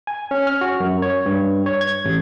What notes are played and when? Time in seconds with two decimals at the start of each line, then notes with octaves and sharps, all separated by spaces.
0.07 G#5
0.31 C#4
0.47 F6
0.61 F#4
0.80 F#2
1.02 C#5
1.26 G2
1.66 C#5
1.81 G#6
2.05 A1